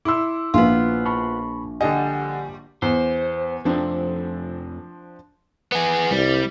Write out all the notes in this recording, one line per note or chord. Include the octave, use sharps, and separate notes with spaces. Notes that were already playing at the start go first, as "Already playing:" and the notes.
E4 C6 D6 E6
A#1 B3 F4
A5 B5 C#6
D3 G3 G4 D#5 F#5 G#5
E2 C5
F2 F3 A3 C4 D4
B3 G#4
C2 G3